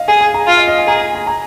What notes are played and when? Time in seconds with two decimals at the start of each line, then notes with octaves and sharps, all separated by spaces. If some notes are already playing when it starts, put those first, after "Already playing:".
Already playing: D#5 F5
0.08 G#4 G#5
0.21 G#5
0.34 A#5
0.47 F4
0.57 D#5
0.68 D#5
0.78 G#5
0.87 G#4 A#5
1.02 G#5
1.15 G#5
1.27 A#5